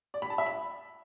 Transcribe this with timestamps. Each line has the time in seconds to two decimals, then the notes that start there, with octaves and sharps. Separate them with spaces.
0.14 D5
0.22 B5
0.30 A5
0.38 E5
0.46 B5